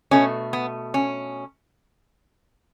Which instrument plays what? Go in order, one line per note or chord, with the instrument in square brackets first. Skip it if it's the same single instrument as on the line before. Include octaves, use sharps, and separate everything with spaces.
[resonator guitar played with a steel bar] B2 A3 C#4
B3
C#4